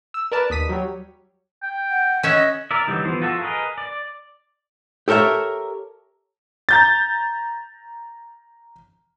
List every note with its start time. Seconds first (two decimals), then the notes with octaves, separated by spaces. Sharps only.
0.14 E6
0.32 A#4 B4 D5 A5
0.50 D#2 D#6 B6 D#7
0.69 F#3 G3 C#5
1.63 G5
1.90 F#5
2.23 C#4 D#5 E5 F#5
2.71 A#4 D5 E5
2.87 D3 E3 F#3 G3 D#4
3.05 E3 F3 B3 C5
3.22 F4 F#4 A4 E5
3.42 G#4 A#4 B4 D#5
3.78 D5
5.08 G4 A4 A#4 C#5 E5
6.69 A#5 G6 A6